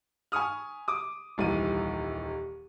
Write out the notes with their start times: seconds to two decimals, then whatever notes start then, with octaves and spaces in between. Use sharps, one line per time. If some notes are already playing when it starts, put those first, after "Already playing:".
0.32 G#5 B5 C#6 D#6 F6
0.88 D6 D#6
1.38 D#1 C2 E3 D#7